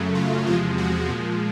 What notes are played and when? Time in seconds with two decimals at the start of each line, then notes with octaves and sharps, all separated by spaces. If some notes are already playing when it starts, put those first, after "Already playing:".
Already playing: F#2 C#3 F#3 A3
0.15 F4
0.46 E2 C3 F3 G#3 F4
0.78 F#4
1.09 A#2 F3 G#3